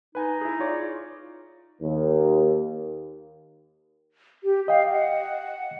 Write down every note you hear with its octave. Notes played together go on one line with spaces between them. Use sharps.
D#4 B4 G#5
E4 G#4
F4 C#5 D5
D#2
G4
D#5 F5 G5
F#5